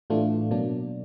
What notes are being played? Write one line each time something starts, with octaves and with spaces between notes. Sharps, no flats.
A2 E3 A3 D4 F4
B2 F#3 A#3 D4